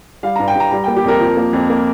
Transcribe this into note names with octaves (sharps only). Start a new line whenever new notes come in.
G3 F5
G2 A#5
G5
G2 A#5
G3 A#5
A#3 G5
G4
F2 A#4
F3
A#3
F2
A#3